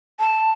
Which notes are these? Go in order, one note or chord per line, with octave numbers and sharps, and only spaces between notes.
A5